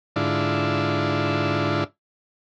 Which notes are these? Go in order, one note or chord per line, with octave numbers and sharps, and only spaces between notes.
G#2 D3 D4 E4 F4